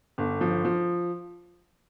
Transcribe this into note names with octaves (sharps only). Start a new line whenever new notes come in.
G1
F3
F3